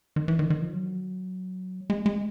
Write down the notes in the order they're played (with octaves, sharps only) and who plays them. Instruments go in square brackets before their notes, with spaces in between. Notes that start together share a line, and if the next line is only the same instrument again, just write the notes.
[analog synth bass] D#3
E3
D#3
D#3
F3
F#3
G#3
G#3